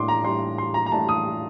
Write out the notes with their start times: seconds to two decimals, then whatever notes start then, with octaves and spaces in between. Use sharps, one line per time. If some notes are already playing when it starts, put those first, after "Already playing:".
Already playing: A2 G3 D4 C6 D6
0.08 A#5
0.24 A2 G3 D4 C6
0.58 C6
0.74 A#5
0.86 A#5
0.91 A2 G3 D4 A5
1.09 D#6